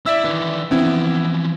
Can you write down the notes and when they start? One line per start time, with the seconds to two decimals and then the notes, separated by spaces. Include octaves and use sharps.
0.06 E4 D5 E5 E6
0.24 D#3 E3 D4
0.71 E3 F3 B3 C4 E4